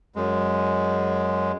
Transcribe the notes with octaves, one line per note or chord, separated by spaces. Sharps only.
F#2 G#3